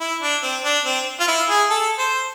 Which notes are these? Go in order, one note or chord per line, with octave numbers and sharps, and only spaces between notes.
E4
D4
C4
D4
C4
F4
E4
G#4
A4
C5